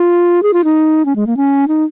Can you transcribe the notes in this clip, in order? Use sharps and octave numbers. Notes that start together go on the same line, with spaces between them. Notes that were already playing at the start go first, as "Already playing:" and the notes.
Already playing: F4
G#4
F4
D#4
C#4
G#3
A#3
C#4
D#4